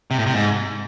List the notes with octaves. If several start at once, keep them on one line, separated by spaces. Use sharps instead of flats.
C3
A2
C3
G#2